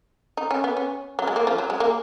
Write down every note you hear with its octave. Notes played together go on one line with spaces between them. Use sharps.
D#4
C#4
B3
C#4
F#3
G#3
A#3
F3
F#3
G#3
A#3